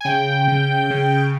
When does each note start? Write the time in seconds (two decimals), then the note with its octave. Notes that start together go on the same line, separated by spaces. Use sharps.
0.01 G#5
0.05 C#3 G5
0.48 C#3
0.90 C#3